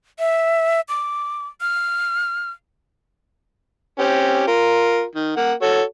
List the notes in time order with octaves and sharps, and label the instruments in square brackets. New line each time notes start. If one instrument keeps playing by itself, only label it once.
[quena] E5
D6
F6
[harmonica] C4 C#4 G4
F4 A#4
D#3
A#3 F#5
F#4 A4 C#5